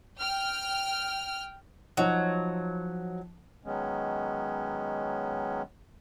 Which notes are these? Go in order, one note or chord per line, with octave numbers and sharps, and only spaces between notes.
G5 F6
F3 F#3 D#4
D#3 F#3 G#3 B3 C#4